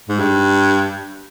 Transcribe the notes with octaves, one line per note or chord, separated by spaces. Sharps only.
G#2
G2